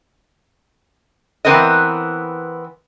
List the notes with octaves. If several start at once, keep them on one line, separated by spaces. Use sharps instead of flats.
E3 B3 C4 A#4 B4 D#5